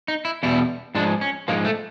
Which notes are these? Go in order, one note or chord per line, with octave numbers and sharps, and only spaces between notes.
D#4
E4
E2 B2 G3 E4
G#2 F3 G#3 D4
C#4
G#2 F3 G#3 A#3
A3